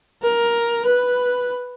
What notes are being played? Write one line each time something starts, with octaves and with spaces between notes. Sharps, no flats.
A#4
B4